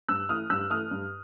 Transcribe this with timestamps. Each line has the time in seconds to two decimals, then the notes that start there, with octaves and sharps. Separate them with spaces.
0.09 G2 E6 F#6
0.29 E3 A3 D#6 F6
0.50 G2 E6 F#6
0.70 E3 A3 D#6 F6
0.91 G2